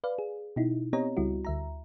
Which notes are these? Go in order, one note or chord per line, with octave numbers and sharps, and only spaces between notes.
B4 D5 F5
G#4
B2 D#4 E4
B3 C4 G4 C#5 D#5 A#5
C#2 G3 E4 F#4
D2 E5 A#5